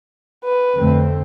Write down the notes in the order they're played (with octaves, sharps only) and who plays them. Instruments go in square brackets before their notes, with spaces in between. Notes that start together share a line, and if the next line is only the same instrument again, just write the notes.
[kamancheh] B4
[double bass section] F2 D3 A3 C4